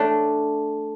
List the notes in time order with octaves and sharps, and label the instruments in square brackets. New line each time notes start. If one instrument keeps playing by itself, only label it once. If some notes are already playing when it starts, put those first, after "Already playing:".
Already playing: [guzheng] A3 D4